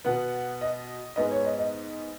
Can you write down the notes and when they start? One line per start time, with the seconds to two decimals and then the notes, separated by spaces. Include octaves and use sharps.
0.05 B2 B3 F#5
0.61 D#5
1.16 G#2 G#3 B3 D#5
1.31 C#5
1.45 D#5
1.58 D#5